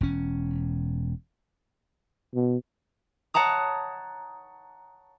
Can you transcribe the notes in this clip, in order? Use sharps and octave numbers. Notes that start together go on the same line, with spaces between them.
E1 C#4
B2
C#5 F#5 A5 A#5 D#6